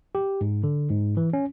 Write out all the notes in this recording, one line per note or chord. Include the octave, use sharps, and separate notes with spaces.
G4
G#2
D3
G#2
E3
C#4